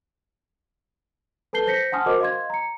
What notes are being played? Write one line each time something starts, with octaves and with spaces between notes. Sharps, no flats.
A4 B4 A5 G6 C7 G7
C5 G6 A#6 B6 C#7
F#5 G#5 A5 C6 D#6 F6
F#4 A#4 C5 D#5 D6
D#5 F5 C6 G#6
A#5 C#7